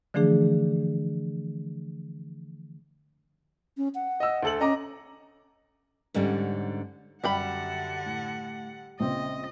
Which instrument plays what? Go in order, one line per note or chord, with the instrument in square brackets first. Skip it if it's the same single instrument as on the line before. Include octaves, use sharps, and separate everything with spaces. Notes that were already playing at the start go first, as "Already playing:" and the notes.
[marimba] D3 E3 F3 A3 D4 G#4
[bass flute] C#4
F#5
[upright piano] D#5 E6
D2 A4 F#7
[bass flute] C#4 [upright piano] D#5 A#5 D6
[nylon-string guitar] G#2 D3 G3 C#4
[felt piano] F#2 [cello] D3 F#5 [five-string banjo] G3 G5 B5
[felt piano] A2
[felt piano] A#1 C#3 C4 [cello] D#5